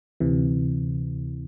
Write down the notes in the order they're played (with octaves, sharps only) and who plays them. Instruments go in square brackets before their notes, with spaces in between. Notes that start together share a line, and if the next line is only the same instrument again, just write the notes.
[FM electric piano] D2 C3 E3